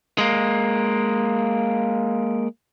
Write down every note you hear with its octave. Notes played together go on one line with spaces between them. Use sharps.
G#3 A#3